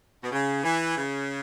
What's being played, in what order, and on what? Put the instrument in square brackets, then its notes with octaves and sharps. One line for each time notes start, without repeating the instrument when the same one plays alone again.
[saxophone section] B2
C#3
E3
C#3